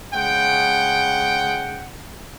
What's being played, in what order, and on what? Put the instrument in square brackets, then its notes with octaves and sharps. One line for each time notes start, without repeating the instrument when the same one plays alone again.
[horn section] C#3 G#3 F#5 G5